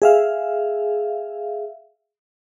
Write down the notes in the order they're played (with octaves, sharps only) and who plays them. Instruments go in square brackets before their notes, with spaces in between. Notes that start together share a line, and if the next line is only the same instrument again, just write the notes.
[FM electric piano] G#4 E5 F5